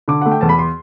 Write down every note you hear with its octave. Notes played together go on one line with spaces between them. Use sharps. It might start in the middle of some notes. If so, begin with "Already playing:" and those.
D3 D6
F#5
A3
G5
E2 A5
B5
C6